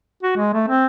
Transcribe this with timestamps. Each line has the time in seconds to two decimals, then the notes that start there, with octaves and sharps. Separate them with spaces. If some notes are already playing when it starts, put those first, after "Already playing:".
0.23 F#4
0.36 G#3
0.53 A3
0.68 C4